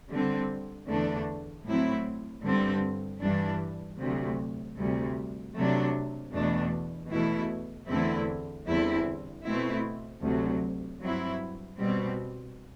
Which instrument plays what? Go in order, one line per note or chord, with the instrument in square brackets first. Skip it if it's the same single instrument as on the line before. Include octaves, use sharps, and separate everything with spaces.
[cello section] D3 G3 C4
E2 D3 A3 D4
A2 F#3 C4 E4
G2 D3 G3 C4
G2 E3 G3 D4
D2 C3 F#3
D2 C3 G3
C3 F#3 A3 D4
E2 B2 A3 D4
E2 B2 A3 E4
E2 D3 A3 C4 E4
E2 D3 G3 C4 E4
B2 A3 C4 E4
D2 C3 F#3
G2 F#3 C4 E4
B2 G3 C4